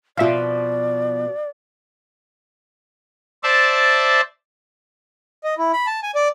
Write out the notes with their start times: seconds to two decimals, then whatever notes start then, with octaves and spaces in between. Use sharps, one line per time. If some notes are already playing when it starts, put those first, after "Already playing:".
0.17 B2 F3 F4 D5 E5 F5
3.43 C5 D5 E5 A5
5.44 D#5
5.58 E4
5.73 B5
5.86 A5
6.03 G#5
6.15 D5